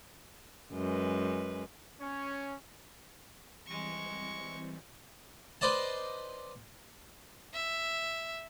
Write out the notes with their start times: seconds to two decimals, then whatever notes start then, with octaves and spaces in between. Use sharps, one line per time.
0.73 F#2 G#3 B4
2.00 C#4
3.66 E3 G3 G#3 C4 C#6
5.61 B4 C5 D5 D#5 A5
7.53 E5